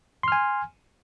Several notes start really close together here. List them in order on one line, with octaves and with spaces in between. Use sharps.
C6 F6 G#5